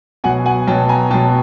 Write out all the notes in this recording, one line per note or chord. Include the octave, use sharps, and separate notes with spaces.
B2 F#3 F#5 G#5
F#5 G#5
B2 F#3 G5 A5
G#5 A#5
B2 F#3 G5 A5